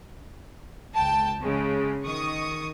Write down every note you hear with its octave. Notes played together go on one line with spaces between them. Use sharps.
C#2 G5 A5
C#3 G#3
D#3 C#6 D#6